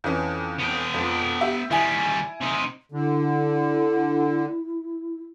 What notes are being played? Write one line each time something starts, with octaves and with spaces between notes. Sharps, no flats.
F2 E3 C#4
B3 G5
F2 F3
G4 E5
D#3 G3 E4 G#5
C3 D#4
D3 E4